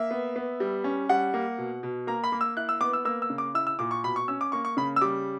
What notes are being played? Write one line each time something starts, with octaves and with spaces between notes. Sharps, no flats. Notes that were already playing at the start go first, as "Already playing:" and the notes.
Already playing: A#3 E5
B3
B3
G3
C#4
G3 F#5
A#3
B2
B2
A#3 A#5
B5
A#3
E6
E4 F#6
E6
B3 D6
E6
A#3 E6
E6
C#3
D6
E4 E6
E6
A#2 D6
C#6
B2 B5
C#6
C#4 E6
D6
A#3 C#6
C#6
C#3 B5
E6
G3 D6